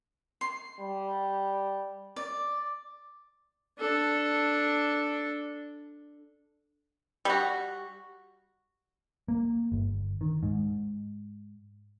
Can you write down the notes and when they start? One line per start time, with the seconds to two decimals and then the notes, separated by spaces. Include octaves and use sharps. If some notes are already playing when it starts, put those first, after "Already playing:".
0.41 C6
0.80 G3
2.16 D5
3.79 D4 A4
7.25 G3 F#4
9.28 A#3
9.72 G1
10.21 D#3
10.43 G#2